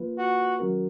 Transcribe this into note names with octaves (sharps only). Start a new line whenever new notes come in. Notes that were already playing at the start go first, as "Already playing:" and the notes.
Already playing: F3 A#3 F4 B4
F#4
D#3 F#3 C#4 F#4 A#4